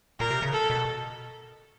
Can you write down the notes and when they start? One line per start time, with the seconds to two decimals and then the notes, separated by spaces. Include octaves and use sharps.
0.20 A#2 A#4
0.30 C3
0.42 C#3
0.53 A4
0.70 B2